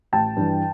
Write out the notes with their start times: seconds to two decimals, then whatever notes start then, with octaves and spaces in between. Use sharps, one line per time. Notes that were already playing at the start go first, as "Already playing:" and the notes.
0.12 A1 G5 A5
0.36 G2 E3